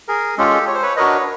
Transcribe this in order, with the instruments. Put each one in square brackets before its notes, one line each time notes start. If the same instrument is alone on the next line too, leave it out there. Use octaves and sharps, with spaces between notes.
[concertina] G#4 A#4
[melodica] G#3 C#4 F4 [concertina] G4 A4
[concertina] C#5
C5
B4 C#5
[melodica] D4 F#4 A#4 D#5 [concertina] B4 C#5